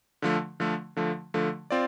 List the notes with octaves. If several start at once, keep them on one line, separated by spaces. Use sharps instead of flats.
D3 F3 A3
D3 F3 A3
D3 F3 A3
D3 F3 A3
C4 F4 D5